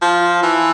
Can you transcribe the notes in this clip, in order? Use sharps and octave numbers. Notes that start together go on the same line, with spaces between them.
F3
E3